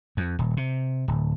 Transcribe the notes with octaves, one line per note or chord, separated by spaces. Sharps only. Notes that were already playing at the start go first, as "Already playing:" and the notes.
F2
D#1
C3
D1